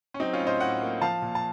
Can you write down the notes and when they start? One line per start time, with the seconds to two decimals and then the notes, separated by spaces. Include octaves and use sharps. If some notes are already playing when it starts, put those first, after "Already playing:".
0.14 C#4
0.19 F#3 C4 D#4
0.33 C#4 F4
0.41 A2
0.47 C5 D#5
0.60 A2 D#5 F#5
0.81 A#3
1.01 F3 F5 A5
1.22 A#2
1.35 A5